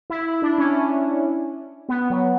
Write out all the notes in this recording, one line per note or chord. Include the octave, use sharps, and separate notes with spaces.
E4
D4
C#4
B3
F#3